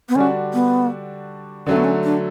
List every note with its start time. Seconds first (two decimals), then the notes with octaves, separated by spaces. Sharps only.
0.09 B3
0.16 D3 G3 C#4 D4 F#4
0.54 B3
1.66 D3 F#3 A3 C#4
1.76 B3
1.84 C#4
2.04 D4